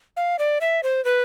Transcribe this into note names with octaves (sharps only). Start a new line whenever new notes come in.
F5
D5
E5
C5
B4